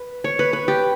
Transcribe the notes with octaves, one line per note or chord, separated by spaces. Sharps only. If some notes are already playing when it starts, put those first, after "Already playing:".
Already playing: B4
C#5
B4
B4
G4